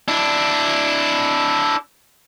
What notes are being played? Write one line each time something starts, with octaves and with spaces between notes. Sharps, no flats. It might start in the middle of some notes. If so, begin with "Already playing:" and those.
D4 E4